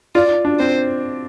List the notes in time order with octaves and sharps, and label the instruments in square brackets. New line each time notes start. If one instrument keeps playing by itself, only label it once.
[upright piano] F4 [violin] D5
[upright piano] D4
[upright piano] C4 [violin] C5